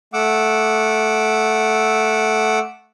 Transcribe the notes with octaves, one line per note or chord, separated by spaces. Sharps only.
A3 F#5 D6 E6